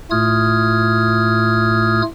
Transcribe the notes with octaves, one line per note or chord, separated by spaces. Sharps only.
A2 A3 F4 D#6 F6 G#6